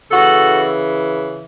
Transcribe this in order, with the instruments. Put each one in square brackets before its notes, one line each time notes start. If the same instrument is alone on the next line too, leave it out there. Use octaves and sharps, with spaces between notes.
[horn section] C#3 E3 F#4 A4